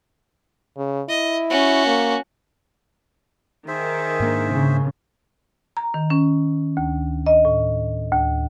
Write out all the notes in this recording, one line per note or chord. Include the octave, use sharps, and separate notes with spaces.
C#3
E4 D#5
C#4 F#4
A#3
D#3 G#4 C5 E5
G#2 A#3 D4
C#3
A#5
D#3
C#4
D2
D#5
A2
D2